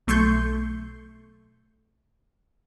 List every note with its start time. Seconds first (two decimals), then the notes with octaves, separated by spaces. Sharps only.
0.07 B1 A3 C6 C#6 G6